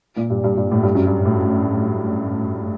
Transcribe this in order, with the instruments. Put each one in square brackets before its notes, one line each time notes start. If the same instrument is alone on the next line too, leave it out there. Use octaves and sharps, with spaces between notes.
[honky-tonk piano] A#2
G2
G2
G2
A2
G2
F#2
G2
A2